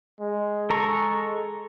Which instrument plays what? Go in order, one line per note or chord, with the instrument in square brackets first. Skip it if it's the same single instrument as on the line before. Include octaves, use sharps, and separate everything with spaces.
[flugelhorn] G#3
[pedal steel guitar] A4 A#5 C#6